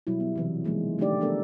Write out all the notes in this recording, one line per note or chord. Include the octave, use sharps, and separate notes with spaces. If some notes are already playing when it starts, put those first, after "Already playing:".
B2 F#3 G3 E4
B3
C3 E3 F#3
D#3 F3 G#3 A#3
D3 A3 D4 D#4 G4 D5
A3 B3 D4 A4 A#4